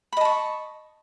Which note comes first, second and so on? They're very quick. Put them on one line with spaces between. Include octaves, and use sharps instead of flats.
B5 D#5 A5 C#6